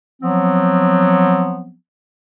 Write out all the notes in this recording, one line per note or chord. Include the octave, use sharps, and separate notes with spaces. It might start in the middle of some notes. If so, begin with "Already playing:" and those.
F3 F#3 B3 C4